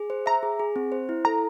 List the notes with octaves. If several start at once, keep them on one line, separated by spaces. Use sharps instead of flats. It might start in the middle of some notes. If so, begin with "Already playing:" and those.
Already playing: G#4
C5
E5 A#5
G#4
G#4
C4
C5
E4
A4 A#5